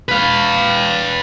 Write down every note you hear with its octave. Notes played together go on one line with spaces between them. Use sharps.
B4 F5